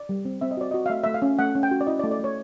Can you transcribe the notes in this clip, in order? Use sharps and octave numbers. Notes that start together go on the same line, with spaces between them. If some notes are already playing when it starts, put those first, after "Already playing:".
Already playing: D5
G3
C4
C4 E5
D#5
F#4 D5
F#4 D#5
F5
A3 E5
A3 E5
F5
C#4
A3 F#5
C#4
G5
F#4
D5
E4 D#5
D5
A3
D5
A3 C#5